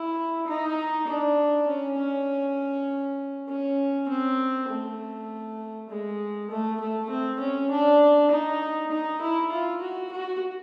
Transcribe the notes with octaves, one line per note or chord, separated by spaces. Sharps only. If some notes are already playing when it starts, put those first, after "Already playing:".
Already playing: E4
D#4
D4
C#4
C#4
C#4
C4
A3
G#3
A3
A3
C4
C#4
D4
D#4
D#4
E4
F4
F#4
F#4